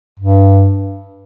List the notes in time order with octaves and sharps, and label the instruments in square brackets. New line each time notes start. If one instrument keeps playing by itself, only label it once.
[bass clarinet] G2